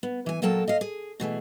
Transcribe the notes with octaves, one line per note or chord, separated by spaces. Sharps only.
B3
E3 G#5
A#2 F#3 A#3 A4 G5 A5
D#5 F5
G#4
B2 E3 A3 G#4